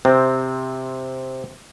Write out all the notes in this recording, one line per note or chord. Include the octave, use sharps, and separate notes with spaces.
C3 C4